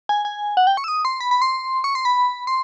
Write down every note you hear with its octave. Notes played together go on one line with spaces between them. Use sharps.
G#5
G#5
F#5
G5
C#6
E6
D#6
C6
B5
B5
C6
C#6
C6
B5
C6